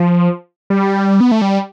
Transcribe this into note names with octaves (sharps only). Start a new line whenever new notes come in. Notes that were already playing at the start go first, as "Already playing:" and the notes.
Already playing: F3
G3
B3
A3
G3